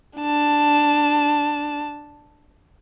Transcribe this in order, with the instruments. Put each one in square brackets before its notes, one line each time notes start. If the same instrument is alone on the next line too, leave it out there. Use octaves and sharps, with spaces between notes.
[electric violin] D4 A5